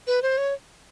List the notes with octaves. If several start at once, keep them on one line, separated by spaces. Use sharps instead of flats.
B4
C5
C#5